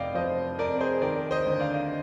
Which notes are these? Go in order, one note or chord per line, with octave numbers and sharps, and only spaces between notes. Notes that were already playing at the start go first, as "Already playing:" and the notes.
Already playing: F1 D5 D#5 F5 G5
F3 C5 D#5
F2 A#4 D5
G#4 C5
D#3 A#4 D5
C5 D#5
D2
D5 F5